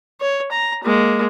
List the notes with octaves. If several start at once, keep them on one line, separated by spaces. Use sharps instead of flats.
C#5
A#5
G#3 A#3